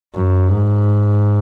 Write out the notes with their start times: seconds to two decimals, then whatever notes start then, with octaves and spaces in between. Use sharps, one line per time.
0.15 F#2
0.49 G#2